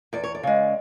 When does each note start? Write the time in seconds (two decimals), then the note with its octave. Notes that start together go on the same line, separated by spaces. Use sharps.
0.13 E2 D5
0.24 C#5
0.35 D5
0.43 C#3 G#3